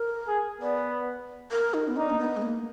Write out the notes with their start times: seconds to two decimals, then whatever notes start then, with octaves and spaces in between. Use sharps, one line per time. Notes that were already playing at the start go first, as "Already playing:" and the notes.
Already playing: A#4
0.27 G#4
0.61 B3 D5
1.51 A#4
1.74 D#4
1.88 B3
1.97 D4 D#4
2.10 A#3
2.19 B3
2.37 G#3
2.42 A#3